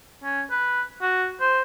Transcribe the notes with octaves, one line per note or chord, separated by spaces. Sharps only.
C#4
B4
F#4
C5